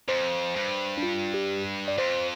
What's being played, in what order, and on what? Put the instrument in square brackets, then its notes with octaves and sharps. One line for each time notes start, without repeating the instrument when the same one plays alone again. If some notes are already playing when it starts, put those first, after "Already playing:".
[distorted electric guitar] F2 [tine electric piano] C5
[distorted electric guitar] G2
[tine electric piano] D4
F4
G4
D5
[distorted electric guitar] F2 [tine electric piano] C5